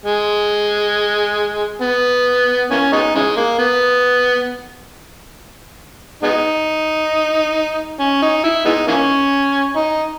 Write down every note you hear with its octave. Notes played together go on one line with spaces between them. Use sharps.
G#3
B3
E3 A#3 C#4
G#3 B3 D#4
C#3 E3 G#3
A#3
B3
G#3 B3 D#4
C#4
D#4
E4
G#3 B3 D#4
E3 A#3 C#4
D#4